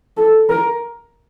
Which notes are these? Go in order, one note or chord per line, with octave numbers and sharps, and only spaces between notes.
A4
A#4